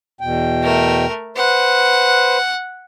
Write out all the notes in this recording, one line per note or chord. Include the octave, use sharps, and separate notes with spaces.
E2 B2 G5
A3 A#4
B4 C5 F#5